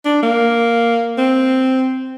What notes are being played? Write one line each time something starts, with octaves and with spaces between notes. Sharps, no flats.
D4
A#3
C4